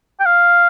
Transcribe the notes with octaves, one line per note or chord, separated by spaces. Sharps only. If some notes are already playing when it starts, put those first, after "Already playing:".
G5
F5